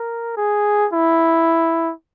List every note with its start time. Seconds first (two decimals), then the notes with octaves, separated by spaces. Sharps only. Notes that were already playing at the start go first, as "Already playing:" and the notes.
Already playing: A#4
0.37 G#4
0.93 E4